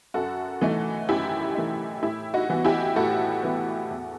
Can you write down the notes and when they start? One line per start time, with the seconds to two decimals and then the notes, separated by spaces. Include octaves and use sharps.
0.14 F#2 F#4 A4
0.61 E3 A3 D#4
1.09 F#2 E4 G4
1.55 E3 A3 D#4
2.02 A2 E4 G4
2.34 D#4 F#4
2.50 E3 B3
2.65 E4 G4
2.96 A2 F#4 A4
3.43 E3 B3
3.91 E2